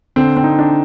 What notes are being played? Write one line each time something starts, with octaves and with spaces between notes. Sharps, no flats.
D3 C4
C4
D#4
D4